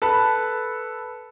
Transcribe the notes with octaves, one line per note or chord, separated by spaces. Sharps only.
A4 B4 A5 B5